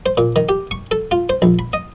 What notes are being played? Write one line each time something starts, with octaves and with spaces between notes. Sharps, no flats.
C5
A#2
D#3
G4
C#6
A4
F4
C5
A#1
B5
D#5